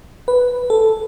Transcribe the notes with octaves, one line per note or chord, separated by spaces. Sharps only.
B4
A4